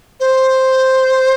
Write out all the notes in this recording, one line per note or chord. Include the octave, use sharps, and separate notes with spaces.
C5